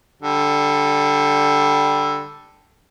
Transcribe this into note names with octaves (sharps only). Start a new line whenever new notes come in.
D3 G3